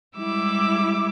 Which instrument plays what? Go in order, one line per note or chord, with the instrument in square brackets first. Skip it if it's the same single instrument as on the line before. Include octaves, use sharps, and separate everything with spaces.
[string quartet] G3 G#3 E4 D6 E6